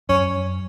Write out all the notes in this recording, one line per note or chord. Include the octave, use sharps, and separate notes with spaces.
F#2 C#4